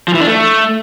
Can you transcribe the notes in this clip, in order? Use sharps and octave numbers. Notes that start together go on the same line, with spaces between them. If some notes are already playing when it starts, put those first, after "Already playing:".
F3
E3
D4
A3